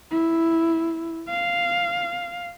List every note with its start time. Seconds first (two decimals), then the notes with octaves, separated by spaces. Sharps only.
0.11 E4
1.29 F5